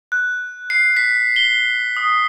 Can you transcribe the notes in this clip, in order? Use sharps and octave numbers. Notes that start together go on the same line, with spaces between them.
F#6
C7
B6
G7
D#6